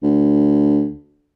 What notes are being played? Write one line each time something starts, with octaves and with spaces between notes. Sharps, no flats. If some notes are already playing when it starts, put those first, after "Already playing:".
D2